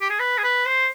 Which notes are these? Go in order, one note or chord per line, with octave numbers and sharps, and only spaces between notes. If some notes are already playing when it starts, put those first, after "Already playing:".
G4
G#4
B4
G#4
B4
C5